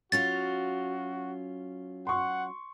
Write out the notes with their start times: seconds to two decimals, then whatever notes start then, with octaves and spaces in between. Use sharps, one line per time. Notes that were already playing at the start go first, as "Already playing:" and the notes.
0.12 F#3 C#4 F4 F#4 A6
2.07 F#5 C6 C#6